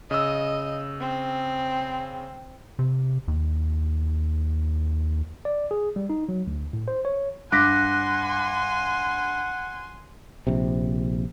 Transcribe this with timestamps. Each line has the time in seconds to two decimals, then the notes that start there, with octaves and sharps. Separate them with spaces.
0.11 C#3 D#5 E6
1.00 C4
2.79 C3
3.28 D#2
5.45 D5
5.71 G#4
5.96 G3
6.10 D#4
6.29 F#3
6.47 D2
6.73 A2
6.88 C5
7.05 C#5
7.52 G2 F#5 G#5 C6 D6 F#6 A#6 B6
10.47 A#1 C3